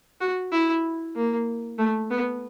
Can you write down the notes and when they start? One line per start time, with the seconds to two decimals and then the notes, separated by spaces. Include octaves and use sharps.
0.21 F#4
0.52 E4
1.16 A#3
1.79 A3
2.11 B3